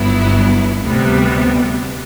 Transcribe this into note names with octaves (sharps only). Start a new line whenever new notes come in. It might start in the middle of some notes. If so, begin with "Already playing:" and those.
Already playing: G1 G2 F#3 B3 E4
D2 C3 G3 B3